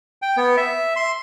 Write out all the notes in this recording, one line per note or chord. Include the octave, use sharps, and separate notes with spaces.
G5
B3
E5
C6